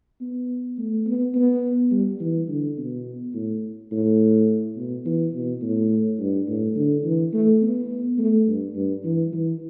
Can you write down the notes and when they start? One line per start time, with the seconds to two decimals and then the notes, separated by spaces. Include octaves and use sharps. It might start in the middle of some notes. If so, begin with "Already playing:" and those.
0.21 B3
0.78 A3
1.06 B3
1.35 B3
1.91 G3
2.20 E3
2.48 D3
2.77 B2
3.34 A2
3.92 A2
4.76 B2
5.05 E3
5.34 B2
5.62 A2
6.19 G2
6.48 A2
6.75 D3
7.04 E3
7.33 A3
7.62 B3
8.19 A3
8.47 G2
8.75 G2
9.04 E3
9.33 E3